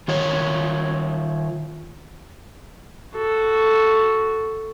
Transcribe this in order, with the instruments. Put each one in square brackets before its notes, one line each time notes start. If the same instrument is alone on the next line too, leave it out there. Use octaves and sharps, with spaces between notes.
[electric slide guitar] D#3 F4 C#5
[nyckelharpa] F#4 A4